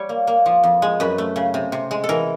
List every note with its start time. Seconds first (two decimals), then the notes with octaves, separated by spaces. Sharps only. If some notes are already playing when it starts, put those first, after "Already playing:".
Already playing: G3 C#5
0.09 A#3
0.27 A#3
0.46 F3
0.63 F2
0.82 G#3
1.00 F#2 B4
1.18 A3
1.36 C#3
1.54 C3
1.72 C3
1.91 G#3
2.04 A4
2.09 E3 A#4